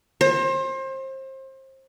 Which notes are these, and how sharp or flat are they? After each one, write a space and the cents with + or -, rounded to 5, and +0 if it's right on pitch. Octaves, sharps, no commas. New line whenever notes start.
C5 +30